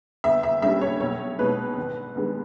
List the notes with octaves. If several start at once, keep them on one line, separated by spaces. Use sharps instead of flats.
G1 E5
E5
G2 G3 C#4 E5
C#5
B1 C#5
B2 G#3 D#4 B4
G#1
G2 D#3 G#3 B3